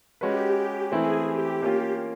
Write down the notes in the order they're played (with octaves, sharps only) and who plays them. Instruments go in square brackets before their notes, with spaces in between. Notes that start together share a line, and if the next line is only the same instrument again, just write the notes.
[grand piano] G#3 C#4 F#4 B4 [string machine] G4
[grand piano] E3 A3 C4 E4 [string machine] G#4
[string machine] G4
[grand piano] A#3 C#4 F4